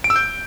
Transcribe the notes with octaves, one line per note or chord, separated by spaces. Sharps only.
D7
E6
G6